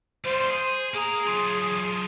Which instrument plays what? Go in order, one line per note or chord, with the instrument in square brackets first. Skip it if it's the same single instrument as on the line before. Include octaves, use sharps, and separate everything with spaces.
[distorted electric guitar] G3 F4 [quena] C5
[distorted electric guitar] G#4
[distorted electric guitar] A#3 A#5 [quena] G#4
[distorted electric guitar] F#3 F4